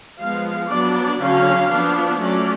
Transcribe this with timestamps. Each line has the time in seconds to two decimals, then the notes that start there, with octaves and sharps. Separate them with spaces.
0.19 F3 G#3 B3 F5
0.69 F#3 B3 D4 D5
1.20 D3 F#3 C#4 F5
1.70 F3 B3 D4
2.20 F#3 A3 C#4 D5